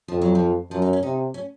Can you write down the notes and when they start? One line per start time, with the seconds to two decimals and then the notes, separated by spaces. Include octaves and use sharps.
0.08 F2 F3
0.22 F#3
0.35 F3
0.71 F#2 F3
0.82 D#4
0.93 C#4
1.03 C3 D#4
1.34 C#4